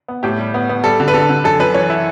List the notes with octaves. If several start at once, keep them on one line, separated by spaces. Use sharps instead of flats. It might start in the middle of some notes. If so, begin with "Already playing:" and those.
B3
A2 G4
G3
B3
B3
G3 A4
D3
B4
D3 A4
D3
F#2 A4
F#2 B4
E3 C#5
E4